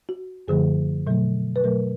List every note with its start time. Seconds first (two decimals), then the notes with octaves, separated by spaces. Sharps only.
0.09 F#4
0.48 F#2 D3 F3 A3 G#4
1.07 B2 F#3 A3
1.56 B4
1.64 B2 F#3 A3 A#4